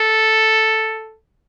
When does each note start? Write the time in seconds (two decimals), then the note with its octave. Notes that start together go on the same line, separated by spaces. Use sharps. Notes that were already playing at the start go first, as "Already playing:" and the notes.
Already playing: A4